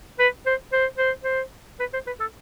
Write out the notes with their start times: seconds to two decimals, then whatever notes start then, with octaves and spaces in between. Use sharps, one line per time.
0.20 B4
0.46 C5
0.73 C5
0.98 C5
1.24 C5
1.80 B4
1.93 C5
2.07 B4
2.20 A4